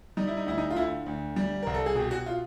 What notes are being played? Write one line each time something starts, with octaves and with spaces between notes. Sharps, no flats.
G3 D#4
E4
D#4
D2 E4
D#4
F4
D3 E4
D2
G3
C2 A#4
A4
G#4
B2 G4
F#4
F4